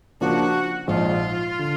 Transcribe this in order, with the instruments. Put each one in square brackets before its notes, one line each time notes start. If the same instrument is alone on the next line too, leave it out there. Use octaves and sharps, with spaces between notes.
[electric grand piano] C#3 F3 A#3 D4 [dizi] F#4
[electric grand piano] A#1 G#2 F3 [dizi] F4
[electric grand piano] D3